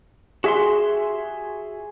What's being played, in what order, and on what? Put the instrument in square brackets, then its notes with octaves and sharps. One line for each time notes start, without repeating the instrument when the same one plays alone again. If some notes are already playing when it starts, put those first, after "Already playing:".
[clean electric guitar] F#4 E5 C6 [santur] G#4